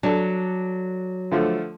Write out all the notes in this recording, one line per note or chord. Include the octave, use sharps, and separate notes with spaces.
F#3 D4 A4
D3 F3 A3